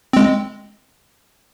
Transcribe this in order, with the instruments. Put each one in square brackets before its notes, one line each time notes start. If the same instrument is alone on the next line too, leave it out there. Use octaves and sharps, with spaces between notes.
[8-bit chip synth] G#3 C4